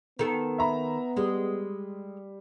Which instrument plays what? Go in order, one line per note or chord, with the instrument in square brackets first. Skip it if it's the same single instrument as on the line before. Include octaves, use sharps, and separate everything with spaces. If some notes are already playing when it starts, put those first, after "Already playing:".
[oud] D#3 A4 [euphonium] B3
[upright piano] E5 A#5 B5
[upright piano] G3 [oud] G#3